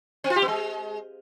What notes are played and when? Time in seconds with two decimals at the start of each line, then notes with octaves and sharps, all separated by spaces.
0.24 C4
0.30 F4
0.36 G4
0.42 B3
0.48 G#3